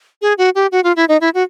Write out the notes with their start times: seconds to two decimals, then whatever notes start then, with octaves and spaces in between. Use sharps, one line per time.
0.22 G#4
0.38 F#4
0.55 G4
0.72 F#4
0.84 F4
0.96 E4
1.09 D#4
1.21 E4
1.34 F#4